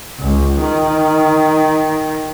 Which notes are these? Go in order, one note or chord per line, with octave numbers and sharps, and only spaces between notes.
C#2
D#3